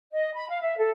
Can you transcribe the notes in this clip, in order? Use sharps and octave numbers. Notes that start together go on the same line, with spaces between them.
D#5
B5
F5
E5
A4